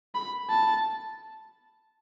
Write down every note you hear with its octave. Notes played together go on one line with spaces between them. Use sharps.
B5
A5